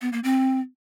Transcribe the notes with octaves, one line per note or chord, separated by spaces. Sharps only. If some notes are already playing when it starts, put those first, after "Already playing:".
B3
A#3
C4